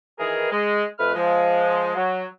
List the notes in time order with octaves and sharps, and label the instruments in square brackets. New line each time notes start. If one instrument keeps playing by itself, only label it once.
[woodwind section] D#3 E3 G#4 A#4
G#3
F2 A3 B4 F6
F3 G#3
F#3